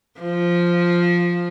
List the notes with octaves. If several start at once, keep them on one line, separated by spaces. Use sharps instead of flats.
F3